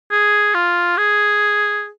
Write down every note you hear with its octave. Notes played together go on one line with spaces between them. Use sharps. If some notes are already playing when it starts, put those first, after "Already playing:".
G#4
F4
G#4